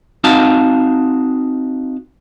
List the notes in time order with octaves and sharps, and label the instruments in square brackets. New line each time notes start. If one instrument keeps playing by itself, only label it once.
[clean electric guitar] C4 D#4 F#4 F5 A5